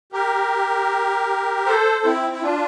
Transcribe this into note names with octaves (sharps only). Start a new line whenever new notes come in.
G4 A#4
A4 C5
C4 E4
E4
D4 F4